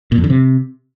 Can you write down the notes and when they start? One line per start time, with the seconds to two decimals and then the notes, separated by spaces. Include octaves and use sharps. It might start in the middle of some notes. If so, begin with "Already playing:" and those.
0.12 A#2
0.18 F2
0.24 D3
0.30 C3